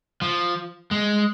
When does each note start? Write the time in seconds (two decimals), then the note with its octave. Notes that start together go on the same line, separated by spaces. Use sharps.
0.22 F3
0.91 G#3